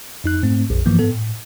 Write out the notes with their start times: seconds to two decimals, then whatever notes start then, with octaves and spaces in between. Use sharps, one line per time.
0.24 F2 D#4 F#6
0.43 G#2 A3 C4
0.70 A#1 F2
0.86 G2 E3 F3 A#3
0.99 G#2 B3 A4
1.11 A2